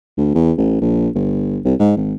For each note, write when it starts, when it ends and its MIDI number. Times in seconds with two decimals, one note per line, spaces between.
0.17 0.33 38
0.35 0.52 40
0.58 0.81 33
0.81 1.09 34
1.15 1.59 31
1.65 1.74 36
1.79 1.92 44
1.97 2.14 32